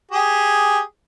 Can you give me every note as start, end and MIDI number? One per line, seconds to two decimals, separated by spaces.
0.12 0.79 67
0.12 0.79 68